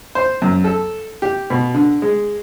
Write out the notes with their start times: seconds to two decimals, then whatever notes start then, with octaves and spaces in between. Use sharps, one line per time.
0.15 C5
0.42 F#2
0.64 A4
1.22 G4
1.50 B2
1.75 D3
2.02 G#3